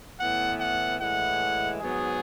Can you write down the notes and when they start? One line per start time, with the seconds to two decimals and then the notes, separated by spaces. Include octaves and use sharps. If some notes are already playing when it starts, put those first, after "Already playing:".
0.18 A2 E3 B3 F#5
0.59 F#5
0.99 A2 E3 G#3 F#5
1.80 G#2 F#3 B3 G#4